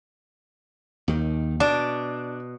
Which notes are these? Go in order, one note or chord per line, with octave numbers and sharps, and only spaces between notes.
D#2 D#3
B2 D4